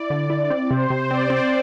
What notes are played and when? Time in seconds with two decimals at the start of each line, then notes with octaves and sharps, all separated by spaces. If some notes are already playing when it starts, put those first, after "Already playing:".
Already playing: E4 D5
0.10 D3
0.30 E4
0.50 C4
0.70 C3 C5
0.90 C3
1.10 C4 D5
1.30 C4